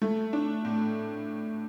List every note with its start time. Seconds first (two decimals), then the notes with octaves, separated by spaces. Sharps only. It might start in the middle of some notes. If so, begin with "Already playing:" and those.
0.02 A3
0.33 D4
0.65 A2